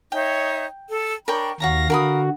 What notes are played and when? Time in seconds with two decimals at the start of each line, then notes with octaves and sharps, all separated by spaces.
0.12 D#4 C#5 E5 G5
0.89 A4
1.28 D4 A#4 C#5 G5 B5
1.60 D#2 F#4 C#5 F5 A#5 A#6
1.90 D3 F#4 A#4 B5 D#6